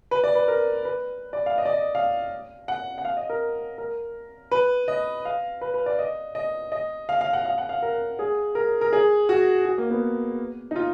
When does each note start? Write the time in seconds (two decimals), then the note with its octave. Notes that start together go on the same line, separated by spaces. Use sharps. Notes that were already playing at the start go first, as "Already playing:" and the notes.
0.11 B4
0.24 D5
0.35 B4
0.48 A#4
0.85 B4
1.33 D5
1.46 F5
1.58 D#5
1.65 D5
1.73 D#5
1.95 F5
2.68 F#5
2.98 F#5
3.05 F5
3.17 D#5
3.29 A#4
3.78 A#4
4.51 B4
4.88 D#5
5.25 F5
5.61 B4
5.74 B4
5.86 D5
5.99 D#5
6.35 D#5
6.72 D#5
7.09 F5
7.21 F5
7.33 F#5
7.45 F5
7.58 F#5
7.69 F5
7.82 A#4
8.19 G#4
8.55 A#4
8.81 A#4
8.93 G#4
9.29 F#4
9.65 F#4
9.78 A#3
9.90 B3
10.71 D#4
10.76 F4